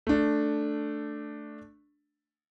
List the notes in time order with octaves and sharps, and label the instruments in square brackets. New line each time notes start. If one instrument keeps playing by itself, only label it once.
[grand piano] A3 D4